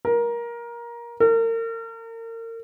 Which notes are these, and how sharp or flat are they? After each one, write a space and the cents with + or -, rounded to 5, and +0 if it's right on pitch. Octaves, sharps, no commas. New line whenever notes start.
A#4 +20
A#4 -35